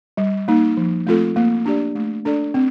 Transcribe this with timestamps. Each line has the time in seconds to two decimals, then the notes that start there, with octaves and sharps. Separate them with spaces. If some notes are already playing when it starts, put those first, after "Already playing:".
0.17 G3
0.48 A#3 D#4
0.77 F3
1.07 A3 C4 F4 A4
1.36 A#3
1.66 D4 G4 D5
1.95 A3
2.25 D4 A4 D5
2.54 C4